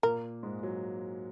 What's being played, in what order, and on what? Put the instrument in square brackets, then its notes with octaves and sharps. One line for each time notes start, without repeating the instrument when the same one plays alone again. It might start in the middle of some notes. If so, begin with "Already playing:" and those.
[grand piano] A#2 A#3 [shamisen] A#4
[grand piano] G#2 G#3
F#3